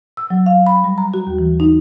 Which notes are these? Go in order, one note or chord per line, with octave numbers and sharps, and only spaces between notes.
E6
F#3
F5
B5
G3
A#5
F#4
D#2
E3
D#4